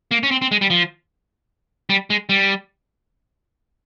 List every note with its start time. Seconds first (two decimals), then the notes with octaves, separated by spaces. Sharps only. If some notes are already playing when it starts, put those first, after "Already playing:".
0.11 A#3
0.23 C#4
0.31 C4
0.42 C4
0.51 G#3
0.61 G3
0.70 F3
1.90 G3
2.10 G#3
2.29 G3